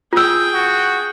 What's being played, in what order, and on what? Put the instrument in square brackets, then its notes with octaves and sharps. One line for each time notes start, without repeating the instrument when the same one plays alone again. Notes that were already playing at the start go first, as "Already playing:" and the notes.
[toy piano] F4 E6 [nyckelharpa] G#4 G5
[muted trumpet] F#4